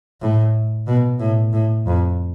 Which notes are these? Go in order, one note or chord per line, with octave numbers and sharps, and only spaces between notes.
A2
B2
A2
A2
F2